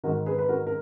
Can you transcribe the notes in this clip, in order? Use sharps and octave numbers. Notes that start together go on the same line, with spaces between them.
G#2 D#3 F#4 A#4
G#4 B4
B4
F#4 A#4
A#4